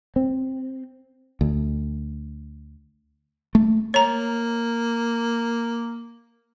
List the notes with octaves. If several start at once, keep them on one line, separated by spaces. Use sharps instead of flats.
C4
D2
A3
A#3 C#5 A#5